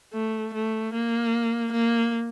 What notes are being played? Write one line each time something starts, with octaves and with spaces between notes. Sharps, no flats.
A3
A3
A#3
A#3